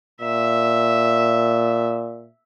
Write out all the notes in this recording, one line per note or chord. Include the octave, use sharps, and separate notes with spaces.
A#2 E5